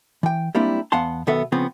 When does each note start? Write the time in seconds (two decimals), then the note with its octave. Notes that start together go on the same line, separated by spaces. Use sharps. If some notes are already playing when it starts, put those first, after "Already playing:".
0.23 E3 G5
0.55 G3 G#3 A#3 C4 D4 E4
0.92 E2 B3 F5 F#5 A5 C6
1.27 B1 D#3 B3 A4 E5 F#5
1.52 C#3 F3 B3 C4